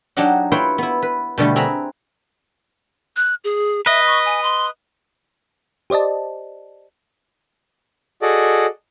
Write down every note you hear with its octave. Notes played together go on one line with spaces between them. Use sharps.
F#3 D4 D#4 G4 D#5 F#5
E4 F4 B4 C#5 G5 C6
B3 E4
B4
B2 D3 G3 A3
C4 G#4 B4 E5 A#5 B5
F#6
G#4
B4 D#5 E5
C#6
G#5
C6
G4 C5 D5 D#5 A5
F#4 G#4 A4 D5 D#5